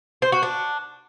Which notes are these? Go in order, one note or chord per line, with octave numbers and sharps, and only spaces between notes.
C5
F#4
D4